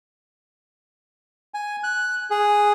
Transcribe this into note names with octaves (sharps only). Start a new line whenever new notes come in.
G#5
F#6
G#4